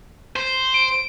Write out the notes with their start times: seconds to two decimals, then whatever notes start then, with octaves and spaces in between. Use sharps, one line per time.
0.36 C5
0.74 D7